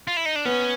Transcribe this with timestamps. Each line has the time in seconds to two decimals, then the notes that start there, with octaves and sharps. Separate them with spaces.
0.07 F4
0.17 E4
0.26 D#4
0.36 D4
0.45 B3 C#4